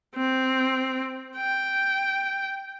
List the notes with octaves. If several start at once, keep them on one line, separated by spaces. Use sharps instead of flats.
C4
G5